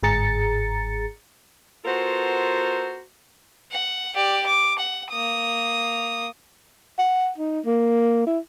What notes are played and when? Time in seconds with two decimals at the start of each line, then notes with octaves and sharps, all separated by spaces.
0.03 G1 G#2 G#4 A#5 A6 C#7
1.85 B3 F4 F#4 A4 A#4 C5
3.71 F#5
4.15 G4 D5
4.46 D6
4.79 F#5
5.11 A#3 D#6
6.99 F#5
7.38 D#4
7.66 A#3
8.27 E4